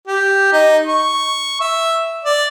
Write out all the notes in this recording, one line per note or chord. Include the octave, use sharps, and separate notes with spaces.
G4
D#4
C#6
E5
D5